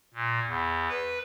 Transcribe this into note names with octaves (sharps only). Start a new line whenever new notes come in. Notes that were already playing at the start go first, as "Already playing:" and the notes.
A#2
E2
B4